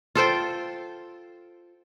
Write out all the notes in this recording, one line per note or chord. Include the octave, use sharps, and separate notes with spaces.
F4 A4 C5 G5